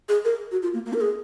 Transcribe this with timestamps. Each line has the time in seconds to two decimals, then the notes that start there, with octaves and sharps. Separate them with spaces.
0.09 G#4
0.25 A#4
0.52 F#4
0.63 F4
0.74 A#3
0.86 A#3
0.93 A#4
1.01 G#4